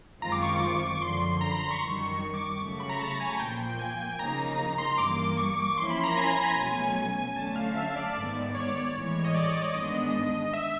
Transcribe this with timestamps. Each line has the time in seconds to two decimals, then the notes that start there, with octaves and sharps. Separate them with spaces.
0.22 F#2 D#3 G#3 C4 F4 A#5
0.32 D6
0.42 C#6
0.52 D6
0.62 D6
0.82 C#6
1.01 F#2 D3 F3 C6
1.41 A#5
1.51 B5
1.60 C6
1.71 C#6
1.81 F#2 D#3 G3 C#6
2.20 C#6
2.34 D6
2.47 C#6
2.60 C#3 F#3 A3 C#6
2.80 B5
2.89 A#5
2.99 A5
3.20 G#5
3.39 A#2 F3 A#3 G5
3.79 G#5
4.18 C#3 F3 A#3 D#4 A#5
4.78 C6
4.98 G2 E3 G3 A#3 D6
5.37 C#6
5.67 C#6
5.78 F3 A#3 C#4 E4 C6
5.90 B5
6.04 A#5
6.17 G#5
6.57 B2 F#3 A3 C#4
7.36 D3 F#3 A3 C#4 A5
7.56 F5
7.75 E5
7.96 D5
8.15 G#2 D#3 G#3 B3
8.55 C#5
8.74 C#5
8.95 A2 E3 G#3
9.24 D#5
9.34 D5
9.74 G#2 D#3 G#3 B3 D4 D#5
10.53 E5